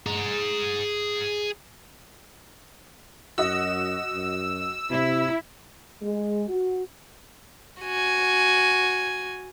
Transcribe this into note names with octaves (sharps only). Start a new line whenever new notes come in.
G#4 A#5
F#2 F#4 D#5 E6
F#2
C3 E4
G#3
F#4
F#4 G#5